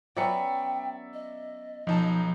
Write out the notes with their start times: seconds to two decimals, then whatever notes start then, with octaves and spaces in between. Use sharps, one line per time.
0.17 F#3 B3 C#4 D5 E5 G5 C#7
1.14 D#5
1.87 B1 F3 D#4 A5